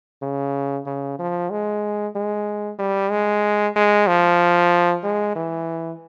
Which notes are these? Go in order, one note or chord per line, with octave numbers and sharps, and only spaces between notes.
C#3
C#3
F3
G#3
G#3
G3
G#3
G#3
F3
G#3
E3